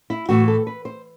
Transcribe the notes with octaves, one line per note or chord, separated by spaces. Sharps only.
E4
A2 E3 F#4
A4
B4
C5